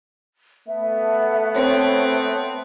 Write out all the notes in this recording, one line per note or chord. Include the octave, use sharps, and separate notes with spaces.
A3 B3 E5
C4 C#5